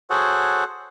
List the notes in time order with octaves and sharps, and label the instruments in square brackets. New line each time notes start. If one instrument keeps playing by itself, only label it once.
[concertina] F#4 G#4 A4 C5 C#5 F#5